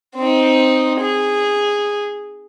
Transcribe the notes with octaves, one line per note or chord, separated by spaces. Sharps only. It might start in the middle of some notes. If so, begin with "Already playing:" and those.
C4 D#4
G#4